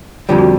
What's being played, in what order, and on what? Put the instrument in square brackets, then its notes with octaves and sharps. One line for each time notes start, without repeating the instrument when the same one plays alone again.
[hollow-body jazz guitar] F2 D3 G3 [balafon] F4
[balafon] F#4